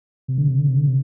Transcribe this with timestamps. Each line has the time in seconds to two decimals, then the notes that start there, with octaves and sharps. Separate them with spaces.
0.28 C3
0.38 D3
0.48 C3
0.58 D3
0.68 C3
0.77 D3
0.87 C3